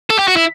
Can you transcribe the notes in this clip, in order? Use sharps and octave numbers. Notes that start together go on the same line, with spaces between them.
A4
G4
F#4
E4